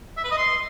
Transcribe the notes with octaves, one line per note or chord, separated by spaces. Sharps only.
E5
B4
D#5
C6